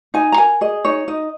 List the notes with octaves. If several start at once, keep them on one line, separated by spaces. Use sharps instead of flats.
D#4 G#5
A#5
A#4 G#5
G#4 D#5
D#4 C#5
D#4 D#5